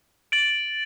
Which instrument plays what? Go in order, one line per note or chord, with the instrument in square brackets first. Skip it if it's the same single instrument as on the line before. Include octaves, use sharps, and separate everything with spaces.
[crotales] A6 D7 F#7